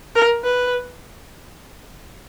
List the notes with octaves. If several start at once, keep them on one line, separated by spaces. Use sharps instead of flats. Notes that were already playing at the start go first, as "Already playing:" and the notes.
A#4
B4